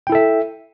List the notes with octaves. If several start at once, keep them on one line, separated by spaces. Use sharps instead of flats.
E4 A4 E5 G5